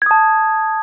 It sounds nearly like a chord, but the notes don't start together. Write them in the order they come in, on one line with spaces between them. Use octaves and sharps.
G#6 D#6 A5